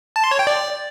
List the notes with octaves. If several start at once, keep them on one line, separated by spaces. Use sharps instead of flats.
A5
C6
C#5
G5
D5